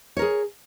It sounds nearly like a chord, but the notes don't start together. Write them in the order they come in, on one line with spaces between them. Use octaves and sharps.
C#5 A#4 G#4